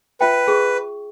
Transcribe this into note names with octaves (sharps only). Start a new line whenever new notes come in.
F4 B4 E5 G5
G#4 C#6